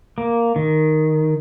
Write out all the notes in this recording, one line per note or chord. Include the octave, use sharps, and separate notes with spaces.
A#3
D#3